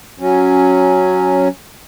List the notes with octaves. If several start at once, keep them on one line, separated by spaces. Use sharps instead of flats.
F#3 C#4